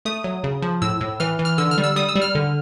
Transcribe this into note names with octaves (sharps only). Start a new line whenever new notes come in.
A3 D#6
F#3
C#3
F3
A2 E6
A2
E3 F6
E3
F6
D3 E6
F6
G3
E6
G3 D#6
E6
G3
F6
D3